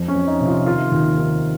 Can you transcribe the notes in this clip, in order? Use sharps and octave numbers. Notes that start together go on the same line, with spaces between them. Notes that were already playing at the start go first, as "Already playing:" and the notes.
Already playing: F2
C#4
F2
D#4
C3
F4
D#3 F4
D#2
D#3